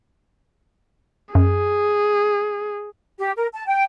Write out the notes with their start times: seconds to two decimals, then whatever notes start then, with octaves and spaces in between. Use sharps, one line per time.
1.35 F#2 G#4
3.19 G4
3.37 A#4
3.54 A5
3.67 G5